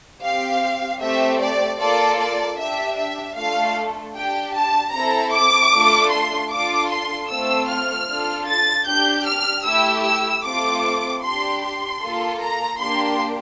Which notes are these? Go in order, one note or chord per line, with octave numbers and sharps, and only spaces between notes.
C4 G4 F5
A3 C4 G4 E5
D5
A#3 F4 A4 D5
D5
D4 G4 E5
E5
A3 D4 F4 A4 F5
D4 G4 G5
A5
C4 E4 A4 A#5
D6
A3 D4 F4 A4
C6
D4 F4 A4 D6
C6
A3 C4 F4 A4 E6
F6
D4 F4 A4
A6
D4 G4 G6
F6
A3 E4 G4 E6
E6
A3 C4 F4 A4 D6
D4 G4 C6
C6
A#3 F4 A4
A#5
A#3 D4 G4 C6